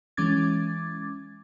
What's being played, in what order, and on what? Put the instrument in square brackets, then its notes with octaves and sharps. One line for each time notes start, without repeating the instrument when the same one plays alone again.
[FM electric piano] E3 G#3 C#4 D6 G#6 A6